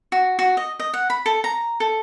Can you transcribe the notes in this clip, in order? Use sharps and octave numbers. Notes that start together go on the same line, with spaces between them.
F#4
F#4
D#5
D#5
F#5
B5
A4
A#5
A4